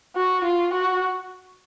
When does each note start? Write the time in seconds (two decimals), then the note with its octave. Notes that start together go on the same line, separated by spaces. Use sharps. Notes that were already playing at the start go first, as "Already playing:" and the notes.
0.16 F#4
0.45 F4
0.74 F#4